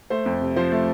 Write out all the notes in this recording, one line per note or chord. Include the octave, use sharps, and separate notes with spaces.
A3 C5
F2
C3
F3 C5
A3